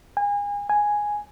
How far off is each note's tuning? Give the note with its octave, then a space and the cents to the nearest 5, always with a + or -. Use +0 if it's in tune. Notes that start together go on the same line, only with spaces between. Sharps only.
G#5 -30
G#5 +0